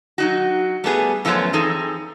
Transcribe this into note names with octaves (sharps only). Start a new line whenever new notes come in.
F#3 D#4 F#4
G3 A3 B3 G#4
F#2 F3 A3 B3 F4 C#5
E3 C4 D#4 G#4 A4